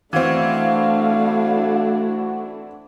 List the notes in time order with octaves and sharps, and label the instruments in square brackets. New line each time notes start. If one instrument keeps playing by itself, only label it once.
[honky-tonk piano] E3 C4 [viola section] A3 D4 E4 [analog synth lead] F#4 [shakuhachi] F5